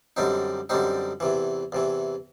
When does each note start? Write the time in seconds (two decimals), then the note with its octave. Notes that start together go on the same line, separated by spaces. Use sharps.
0.17 F#2 D3 G3 C4 D#4
0.69 F#2 D3 G3 C4 D#4
1.20 E2 C3 E3
1.72 E2 C3 E3